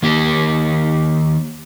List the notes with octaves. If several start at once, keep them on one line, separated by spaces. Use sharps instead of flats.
D#3 A#3 G4